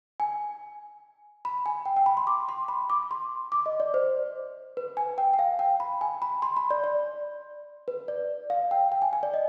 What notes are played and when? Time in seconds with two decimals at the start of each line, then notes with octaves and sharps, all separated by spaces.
0.20 G#5
1.45 B5
1.66 G#5
1.86 G5
1.97 G5
2.06 B5
2.17 C6
2.27 D6
2.49 C6
2.68 B5
2.90 D6
3.11 C6
3.52 D6
3.66 D#5
3.80 D5
3.94 C5
4.77 B4
4.97 G#5
5.18 G5
5.33 G5
5.39 F5
5.59 G5
5.80 B5
6.01 G#5
6.22 B5
6.42 C6
6.57 B5
6.70 D5
6.84 D5
7.88 B4
8.08 D5
8.50 F5
8.71 G5
8.92 G5
9.02 G#5
9.13 G#5
9.23 D5
9.34 D#5